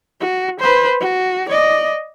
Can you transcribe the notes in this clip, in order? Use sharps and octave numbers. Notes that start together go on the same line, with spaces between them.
F#4
B4 C5
F#4
D5 D#5